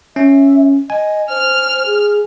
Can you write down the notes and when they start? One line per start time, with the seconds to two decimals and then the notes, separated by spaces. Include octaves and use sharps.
0.16 C#4 E5
0.90 D#5 G#5
1.30 C5 F6
1.86 G#4